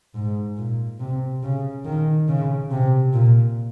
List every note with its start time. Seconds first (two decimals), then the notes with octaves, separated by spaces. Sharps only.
0.15 G#2
0.58 A#2
1.00 C3
1.43 C#3
1.85 D#3
2.28 C#3
2.71 C3
3.13 A#2